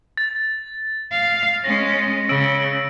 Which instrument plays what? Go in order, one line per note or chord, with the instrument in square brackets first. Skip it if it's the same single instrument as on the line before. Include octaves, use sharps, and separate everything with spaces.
[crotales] A6
[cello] F5
[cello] G#3 C#4 [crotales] A#6
[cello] C#3 [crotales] E6 D7